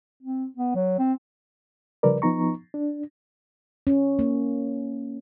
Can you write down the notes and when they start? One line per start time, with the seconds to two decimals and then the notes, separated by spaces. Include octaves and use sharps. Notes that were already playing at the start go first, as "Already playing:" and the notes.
0.23 C4
0.57 B3
0.75 F#3
0.99 C4
2.03 C#3 F3 G3 A#4 B4 D5
2.22 F3 B3 D#4 A#5 C#6
2.74 D4
3.87 C#4
4.19 A#3